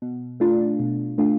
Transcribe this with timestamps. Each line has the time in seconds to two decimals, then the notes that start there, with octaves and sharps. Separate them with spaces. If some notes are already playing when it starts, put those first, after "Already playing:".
0.02 B2
0.40 A3 D4 F4
0.80 B2
1.18 A3 D4 F4